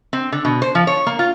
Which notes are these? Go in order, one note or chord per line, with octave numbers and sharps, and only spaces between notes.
C4
D3
B2
C5
F3
C#5
A#3
F4